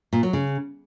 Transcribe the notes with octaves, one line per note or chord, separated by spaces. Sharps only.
A#2
F#3
C#3